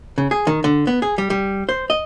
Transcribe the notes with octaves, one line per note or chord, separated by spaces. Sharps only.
C#3
G#4
D#3
D3
B3
G#4
G3
G3
C5
D#5